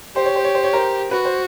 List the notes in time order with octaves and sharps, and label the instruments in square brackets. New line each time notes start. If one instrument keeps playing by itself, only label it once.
[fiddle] G4 [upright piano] C5
[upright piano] C#5
C5
C#5
C5
C#5
A#4 C5
[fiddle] F#4 [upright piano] B4
[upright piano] C5